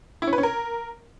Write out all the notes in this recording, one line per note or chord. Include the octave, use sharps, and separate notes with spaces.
E4
C#4
B4
C#4
A#4